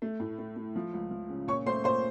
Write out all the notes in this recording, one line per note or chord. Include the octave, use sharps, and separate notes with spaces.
A3
A2
A3
A3
F3
C#2
F3
C#3
A#2 C#5 C#6
A3 C5 C6
A#2 C5 C6